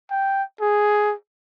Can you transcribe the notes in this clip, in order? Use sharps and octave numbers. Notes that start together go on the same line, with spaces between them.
G5
G#4